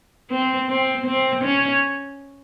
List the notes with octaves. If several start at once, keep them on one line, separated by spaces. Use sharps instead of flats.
C4
C4
C4
C#4